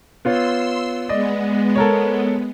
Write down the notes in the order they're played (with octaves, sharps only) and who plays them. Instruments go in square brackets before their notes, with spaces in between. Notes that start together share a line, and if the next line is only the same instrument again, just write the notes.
[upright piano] B3 F4 C#5 [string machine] C6 E6
[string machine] G#3 B3 [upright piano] D5 D#5
[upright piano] A4 A#4 C#5